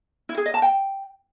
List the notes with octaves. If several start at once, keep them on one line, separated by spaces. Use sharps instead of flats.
E4
G#4
D#5
A5
G5